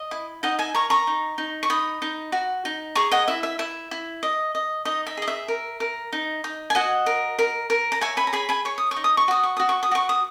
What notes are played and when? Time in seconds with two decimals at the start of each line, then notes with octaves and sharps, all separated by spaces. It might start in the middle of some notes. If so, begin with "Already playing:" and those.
Already playing: D#5
0.11 E4
0.43 D#4 D#5 F#5
0.59 E5 G#5
0.74 A#4 A#5 C#6
0.90 A#5 C#6
1.07 D#4
1.38 D#4
1.63 C#6
1.70 D#4 B5 D#6
2.02 D#4
2.32 F#4
2.65 D#4
2.95 G#4 A#5 C#6
3.11 D#5 F#5
3.28 E4 E5
3.43 E5
3.59 E4 E5
3.91 E4
4.23 D#5
4.55 D#5
4.85 D#4 D#5
5.07 E5
5.17 G#4 D#5
5.28 E5
5.48 A#4
5.80 A#4
6.13 D#4
6.44 D#4
6.70 G#5
6.75 F#4 D#5 F#5
7.06 A#4
7.39 A#4
7.70 A#4
7.92 A#5
8.01 C#5 E5 G#5
8.17 G#5 B5
8.27 A#5
8.33 G#4 G#5 B5
8.49 G#5 B5
8.65 C#5 C#6
8.78 D#6
8.91 C#6
8.96 D#4
9.04 D#6
9.17 C#6
9.28 F#4 D#6
9.43 C#6
9.57 F#4 D#6
9.69 C#6
9.83 D#6
9.91 F#4 C#6
10.09 D#6